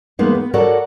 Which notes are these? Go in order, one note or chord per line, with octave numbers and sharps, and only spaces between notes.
E2 G#3 A#3 B3 D#4 F5
B3
F#4 A4 A#4 C#5 D5 F#5